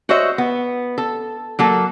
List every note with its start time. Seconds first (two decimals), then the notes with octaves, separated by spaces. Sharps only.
0.09 F#4 C5 C#5 D#5 E5
0.38 B3
0.98 A4
1.59 F#3 A#3 A4